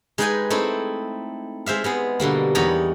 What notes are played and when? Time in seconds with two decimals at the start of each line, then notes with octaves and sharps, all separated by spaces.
0.18 G#3 D#4 B4 D#5 G5 G#5
0.50 A3 C4 D#4 E4
1.66 G#3 C5 E5 F5
1.84 G#3 B3 G#4
2.20 B2 D3 G3 A#3
2.55 E2 D#4 C#5 D#5 A#5 B5